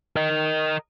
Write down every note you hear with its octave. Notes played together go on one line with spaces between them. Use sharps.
A#4 D#5